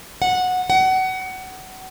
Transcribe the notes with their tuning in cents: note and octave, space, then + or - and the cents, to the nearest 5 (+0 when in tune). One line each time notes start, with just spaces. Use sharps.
F#5 -15
F#5 +25